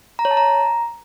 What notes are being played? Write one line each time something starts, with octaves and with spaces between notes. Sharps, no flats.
A#5
C#5
A5
A#5